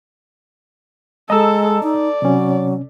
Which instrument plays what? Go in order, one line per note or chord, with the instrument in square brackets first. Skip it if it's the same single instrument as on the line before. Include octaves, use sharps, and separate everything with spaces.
[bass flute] G#3 [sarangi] A4 [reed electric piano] D#5 A#5 E6
[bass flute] D#4 [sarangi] D5
[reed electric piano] C3 C#4 [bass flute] F#3